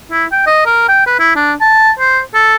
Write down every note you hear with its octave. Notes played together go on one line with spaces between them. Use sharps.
E4
G5
D#5
A#4
G5
B4
E4
D4
A5
C5
A4